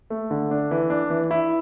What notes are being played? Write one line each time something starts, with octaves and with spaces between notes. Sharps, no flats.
A3
D3
D4
E3
D4
E3
E4